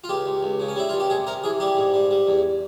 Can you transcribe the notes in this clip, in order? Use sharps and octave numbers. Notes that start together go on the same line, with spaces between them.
F4
C#2 G4
C#2
C#2
C#3
C#4
G3 E4
C#2 F4
G4
C3 G#4
C3 A#4
E3 G#4
G3 G4
G#2
G3
G3
E2